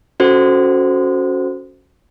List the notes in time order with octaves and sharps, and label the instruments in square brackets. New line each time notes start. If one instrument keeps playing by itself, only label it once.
[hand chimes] C#4 F#4 A4 C5